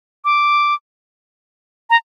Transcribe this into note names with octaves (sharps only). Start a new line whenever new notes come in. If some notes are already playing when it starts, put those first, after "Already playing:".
D6
A#5